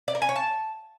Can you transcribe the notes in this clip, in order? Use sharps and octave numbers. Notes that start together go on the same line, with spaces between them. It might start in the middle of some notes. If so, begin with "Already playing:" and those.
D5
A#4
G#5
C#5
A5